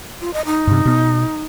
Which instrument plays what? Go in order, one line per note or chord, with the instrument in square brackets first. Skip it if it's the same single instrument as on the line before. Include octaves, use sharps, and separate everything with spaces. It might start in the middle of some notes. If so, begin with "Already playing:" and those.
[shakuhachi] F4
D#5
D#4
[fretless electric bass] G2 C3
B2 B3